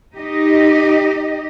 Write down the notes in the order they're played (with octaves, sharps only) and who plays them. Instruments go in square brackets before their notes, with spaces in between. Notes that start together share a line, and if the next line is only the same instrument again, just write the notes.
[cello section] D#4 G4 D#5